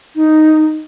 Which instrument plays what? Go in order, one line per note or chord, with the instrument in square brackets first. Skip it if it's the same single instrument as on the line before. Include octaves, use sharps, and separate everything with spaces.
[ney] D#4